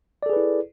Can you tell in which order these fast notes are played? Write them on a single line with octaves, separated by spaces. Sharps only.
D5 A4 G#4 B4 E4